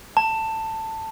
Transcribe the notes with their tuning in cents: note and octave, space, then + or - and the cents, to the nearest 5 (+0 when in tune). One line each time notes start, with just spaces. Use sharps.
A5 +15